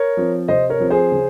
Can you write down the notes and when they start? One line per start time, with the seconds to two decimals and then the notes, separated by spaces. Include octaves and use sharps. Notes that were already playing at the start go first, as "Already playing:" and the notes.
Already playing: A#4 C#5
0.17 F3 C4
0.48 C3 C5 D#5
0.70 A#4 C#5
0.80 F3 C4
0.90 G#4 C5
1.12 C#3